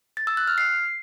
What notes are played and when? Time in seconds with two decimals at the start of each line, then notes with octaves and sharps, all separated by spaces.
0.17 A6
0.27 E6
0.37 F#6
0.48 F6
0.58 C7